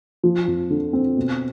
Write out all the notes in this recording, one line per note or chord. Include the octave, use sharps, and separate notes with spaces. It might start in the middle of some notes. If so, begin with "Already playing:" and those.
F3
F2
D3
C4
B2